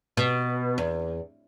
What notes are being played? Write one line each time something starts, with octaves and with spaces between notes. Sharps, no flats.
B2
E2